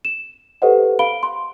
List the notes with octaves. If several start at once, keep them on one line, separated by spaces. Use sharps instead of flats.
E7
G4 A4 B4 C5 D#5 F#5
F5 B5 D7 G7
C6